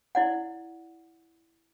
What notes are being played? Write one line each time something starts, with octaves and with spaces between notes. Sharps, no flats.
E4 D5 F#5